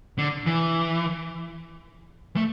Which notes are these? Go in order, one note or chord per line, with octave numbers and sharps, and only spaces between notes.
D3
E3
A3